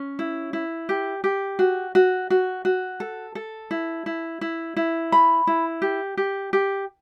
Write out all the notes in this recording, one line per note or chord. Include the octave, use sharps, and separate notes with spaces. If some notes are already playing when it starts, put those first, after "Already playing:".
Already playing: C#4
E4
E4
G4
G4
F#4
F#4
F#4
F#4
A4
A4
E4
E4
E4
E4
B5
E4
G4
G4
G4